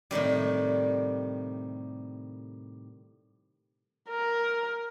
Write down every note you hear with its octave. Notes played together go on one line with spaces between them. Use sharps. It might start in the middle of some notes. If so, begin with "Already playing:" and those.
A2 C3 D#3 G3
A#4